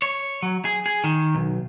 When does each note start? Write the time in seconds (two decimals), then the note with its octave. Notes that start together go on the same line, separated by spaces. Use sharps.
0.02 C#5
0.43 F#3
0.65 G#4
0.86 G#4
1.04 D#3
1.35 B1